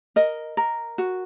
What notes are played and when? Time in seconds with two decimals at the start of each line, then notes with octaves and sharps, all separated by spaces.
0.16 A#4 D#5
0.57 A#4
0.98 F#4